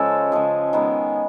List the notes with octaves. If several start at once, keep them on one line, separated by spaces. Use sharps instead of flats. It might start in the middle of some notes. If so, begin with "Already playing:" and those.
Already playing: C#3 F3 G#3 A4
C#3 F3 G#3 G#4
D#3 G#3 B3